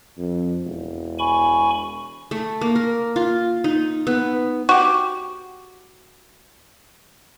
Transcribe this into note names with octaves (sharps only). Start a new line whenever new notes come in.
F2
E1
G#5 B5 C#6
A3
A#3
A#4
F4
D#4
B3
F#4 G4